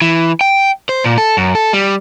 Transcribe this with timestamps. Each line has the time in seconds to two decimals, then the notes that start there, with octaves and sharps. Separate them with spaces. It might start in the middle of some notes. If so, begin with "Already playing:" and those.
0.02 E3
0.41 G5
0.89 C5
1.04 A#2
1.18 A4
1.37 F#2
1.55 A4
1.73 G3